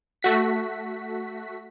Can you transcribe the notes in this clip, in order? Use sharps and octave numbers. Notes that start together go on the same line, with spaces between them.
A3 F#4 B6